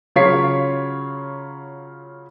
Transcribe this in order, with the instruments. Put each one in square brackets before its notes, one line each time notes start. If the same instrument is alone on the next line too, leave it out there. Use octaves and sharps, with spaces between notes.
[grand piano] C#3 F#3 F4 C#5 B6 C7